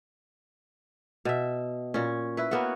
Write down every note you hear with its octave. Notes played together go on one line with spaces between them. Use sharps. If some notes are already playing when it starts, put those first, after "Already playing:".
B2 E5
A#2 C#4
E4 B4
A#3 B3 C#4 F#4